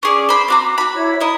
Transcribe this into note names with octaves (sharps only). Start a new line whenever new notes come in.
C#4 G#4 D5 D6
C5 B5
C4 F#4 A#5
F#4 B5
E4 C#5
E4 D#5 A#5 B5